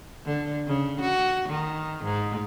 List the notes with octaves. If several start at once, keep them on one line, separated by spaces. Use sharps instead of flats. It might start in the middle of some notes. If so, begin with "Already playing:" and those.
D3
C#3
F#4
D#3
G#2